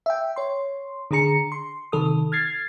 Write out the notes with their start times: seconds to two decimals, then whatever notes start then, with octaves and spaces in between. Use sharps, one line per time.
0.06 E5 G5
0.36 C#5 C6
1.11 D3 D4 G#4 A#5 C#7
1.52 C6
1.92 C3 D#3 A4 D#6
2.32 F6 G#6 A6 C7